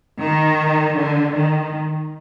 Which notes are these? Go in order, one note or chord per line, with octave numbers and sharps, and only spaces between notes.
D#3
D3
D#3